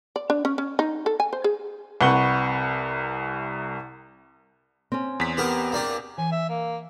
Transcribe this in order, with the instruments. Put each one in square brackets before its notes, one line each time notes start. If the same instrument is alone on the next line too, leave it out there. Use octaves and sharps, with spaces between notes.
[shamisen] D5
D4
C#4
C#4
D#4
A4
G#5
C5
G#4
[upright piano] C2 C3 B4 F#5 C#6 G7
[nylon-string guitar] C4 C#4
[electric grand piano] E2 B6
[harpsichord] B3 G4 A#4
A#3 D4 G4
[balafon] E3 [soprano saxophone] G#5
[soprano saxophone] E5
A#3